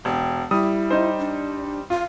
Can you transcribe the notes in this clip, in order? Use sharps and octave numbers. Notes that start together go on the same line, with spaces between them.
E1 G5
G3 E4 D#6
D#4 C5
D4
F4 F5